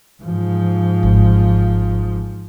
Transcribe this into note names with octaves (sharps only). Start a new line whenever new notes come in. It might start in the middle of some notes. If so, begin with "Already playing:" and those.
G#2 F3
G#1